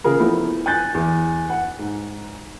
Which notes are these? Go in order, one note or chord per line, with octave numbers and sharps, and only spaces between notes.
C#3 F4 G#4 A#4
F3 A3 B3 E4
G#5 F#6 G6 A6
E2
F#5
G#2